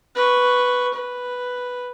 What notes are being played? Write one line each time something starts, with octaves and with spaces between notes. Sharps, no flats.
B4 C#6
B4